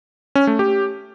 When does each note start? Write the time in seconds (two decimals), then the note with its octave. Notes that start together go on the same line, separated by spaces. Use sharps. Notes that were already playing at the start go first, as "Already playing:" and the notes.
0.35 C#4
0.47 A3
0.59 G4